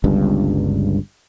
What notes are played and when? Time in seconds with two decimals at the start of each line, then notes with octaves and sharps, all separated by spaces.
0.04 G1 C#2 G2